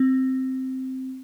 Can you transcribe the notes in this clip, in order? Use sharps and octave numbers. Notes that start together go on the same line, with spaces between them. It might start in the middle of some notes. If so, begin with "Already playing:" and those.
Already playing: C4